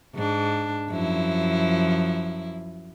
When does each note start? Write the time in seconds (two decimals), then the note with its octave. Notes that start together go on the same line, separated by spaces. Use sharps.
0.14 G#2 D4
0.90 F#2 F3 E4